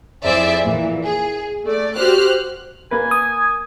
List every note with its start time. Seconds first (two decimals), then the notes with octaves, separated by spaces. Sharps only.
0.25 F2 E4 G#4 C5 D5 E5
0.65 A#2 E3
1.04 G#4
1.65 A3 D5
1.97 F#4 G4 C5 F6 F#6
2.91 A#3 B4 G#5
3.11 D#6